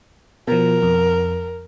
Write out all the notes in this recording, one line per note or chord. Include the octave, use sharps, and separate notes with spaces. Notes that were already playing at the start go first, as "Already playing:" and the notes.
B2 F3 A#4
F2